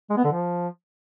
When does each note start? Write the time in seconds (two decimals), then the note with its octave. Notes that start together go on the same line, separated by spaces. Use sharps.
0.10 G#3
0.17 B3
0.25 D3
0.32 F3